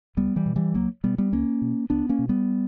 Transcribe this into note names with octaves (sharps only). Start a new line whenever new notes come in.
C#2 G3 B3
E3 G3
B2
E3 G3
C#2 F#3 A#3
B2 G3 B3
G3 B3
C#2 A#3 C#4
B2
C#2 B3 D4
A#3 C#4
B2
G3 B3